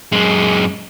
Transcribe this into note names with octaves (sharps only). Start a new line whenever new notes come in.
F#2 G#3